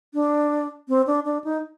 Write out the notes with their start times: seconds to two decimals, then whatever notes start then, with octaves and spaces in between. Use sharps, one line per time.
0.14 D4
0.89 C4
1.07 D4
1.25 D4
1.44 D#4